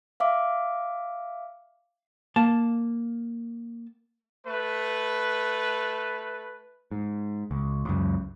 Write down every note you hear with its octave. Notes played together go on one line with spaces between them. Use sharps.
E5 F5 D6
A#3 A5
A3 B4
G#2
C#2
C#2 F#2